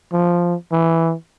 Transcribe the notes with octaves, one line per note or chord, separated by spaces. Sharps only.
F3
E3